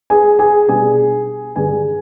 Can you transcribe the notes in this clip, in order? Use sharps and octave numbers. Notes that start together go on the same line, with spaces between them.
G#4 G#5
G#4 G#5
B2 G3 D4 G#4 G#5
G2 D3 G#3 G#4 G#5